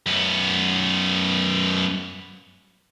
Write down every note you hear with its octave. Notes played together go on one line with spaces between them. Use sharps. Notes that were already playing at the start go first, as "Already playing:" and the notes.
F#2 B3